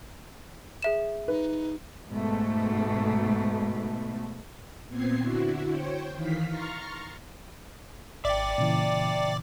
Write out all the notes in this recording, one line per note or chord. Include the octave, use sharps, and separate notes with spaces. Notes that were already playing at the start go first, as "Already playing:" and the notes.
G#4 E5 E7
D#4 B4
G#2 B2 A3
A#2 B3 C4 G#6 C7
D3 E4 F#4
C5 C#5 G5
D#3 E3 F5 B6
A#5 C6 C#6 F6 A6
G#1 D5 E5 G5
A#2 C#3 E3